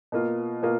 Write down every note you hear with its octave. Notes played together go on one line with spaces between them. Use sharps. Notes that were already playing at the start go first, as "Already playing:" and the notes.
B2 A#3 F4
B2 A#3 F4